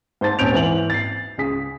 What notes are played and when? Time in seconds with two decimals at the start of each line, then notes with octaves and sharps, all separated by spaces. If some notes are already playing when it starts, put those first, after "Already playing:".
0.21 G#2 C5 A5 A6
0.39 D#1 C#4 G6 D7 F7
0.52 G#2 E3 F#7
0.90 A6 C7
1.38 C#2 G#4 B6